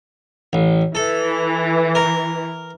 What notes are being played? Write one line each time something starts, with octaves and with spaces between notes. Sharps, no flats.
A1
E3 A4
A#4